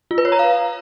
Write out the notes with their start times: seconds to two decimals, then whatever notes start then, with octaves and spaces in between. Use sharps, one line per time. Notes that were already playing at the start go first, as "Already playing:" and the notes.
0.11 F4
0.18 B4
0.25 C#5
0.32 A#5
0.39 F5